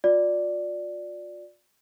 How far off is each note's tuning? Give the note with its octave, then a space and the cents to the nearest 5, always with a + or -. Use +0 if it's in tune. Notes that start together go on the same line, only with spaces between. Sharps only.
F4 +40 D5 +0